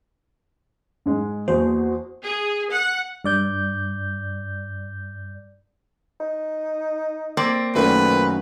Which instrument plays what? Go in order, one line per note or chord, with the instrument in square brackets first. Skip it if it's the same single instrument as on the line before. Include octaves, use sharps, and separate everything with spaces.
[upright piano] G#2 G#3
[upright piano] E2 [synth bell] A#3 [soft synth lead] F#4 [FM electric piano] C5
[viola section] G#4
F#5
[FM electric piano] G2 D5 G6
[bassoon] D#4
[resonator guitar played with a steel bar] A#3 C4 D5
[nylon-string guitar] F#2 D#3 A3 [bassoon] A#2 [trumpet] B4